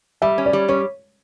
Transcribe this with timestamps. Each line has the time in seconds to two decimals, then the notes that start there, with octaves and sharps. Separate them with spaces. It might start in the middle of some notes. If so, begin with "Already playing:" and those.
0.22 G3 E5
0.38 C#4
0.46 D5
0.53 G3
0.68 C#4 C#5